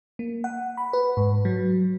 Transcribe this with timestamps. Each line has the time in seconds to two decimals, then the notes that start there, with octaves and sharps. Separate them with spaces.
0.19 A#3
0.44 F#5
0.77 B5
0.93 B4
1.17 G#2
1.45 F#3